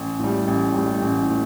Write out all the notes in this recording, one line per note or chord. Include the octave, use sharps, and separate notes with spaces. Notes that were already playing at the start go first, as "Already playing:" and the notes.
Already playing: A1
A2 G3
A1
A2 G3
A1
A2